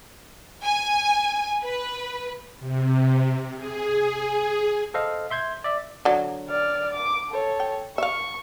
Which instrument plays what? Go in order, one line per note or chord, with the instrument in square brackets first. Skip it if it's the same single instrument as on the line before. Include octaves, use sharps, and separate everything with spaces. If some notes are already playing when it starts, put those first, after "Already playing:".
[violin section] G#5
B4
[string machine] C3
G#4
[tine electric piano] A4 C5 D#5 F5
E5 C6 G6 G#6
D5 E5
[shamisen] D3 F#3
[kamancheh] D5 F6
D6
A4 C#5
[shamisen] G5
[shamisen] E5 F5 [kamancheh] C#6